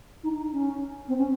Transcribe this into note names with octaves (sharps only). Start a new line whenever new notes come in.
D#4
D#4
C#4
C4
C#4